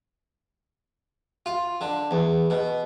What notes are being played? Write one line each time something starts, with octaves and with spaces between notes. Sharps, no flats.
F4
D3
E2
B2